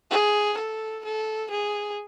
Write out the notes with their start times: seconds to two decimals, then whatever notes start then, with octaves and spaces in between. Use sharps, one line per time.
0.11 G#4
0.57 A4
1.05 A4
1.51 G#4